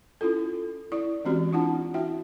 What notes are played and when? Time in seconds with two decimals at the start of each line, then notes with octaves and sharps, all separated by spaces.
0.21 C#4 E4 F4 A4
0.92 E4 D5 C#6
1.25 E3 G#3 C4 C#4 F#4 G4
1.53 D4 E4 F4 F#5 A5
1.94 E4 F#4 E5 G5